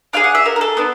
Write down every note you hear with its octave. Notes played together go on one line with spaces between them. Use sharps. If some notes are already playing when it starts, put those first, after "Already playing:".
D4 F4 G#4 F5
F#5
E5
A#4
A#4
A4
B3 D4